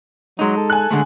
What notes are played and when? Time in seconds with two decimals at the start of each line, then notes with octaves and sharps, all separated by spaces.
0.39 F#3 G#3 D#4
0.56 A4
0.70 G#5 F#6
0.91 D3 G#3 A3